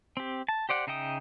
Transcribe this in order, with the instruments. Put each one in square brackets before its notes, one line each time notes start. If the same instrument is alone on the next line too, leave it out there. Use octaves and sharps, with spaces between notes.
[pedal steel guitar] C4 G4
A5
G4 C5 D5 F#5
C#3 D#4 E5 G5 D#6